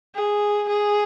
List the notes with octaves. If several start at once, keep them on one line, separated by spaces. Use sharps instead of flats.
G#4
G#4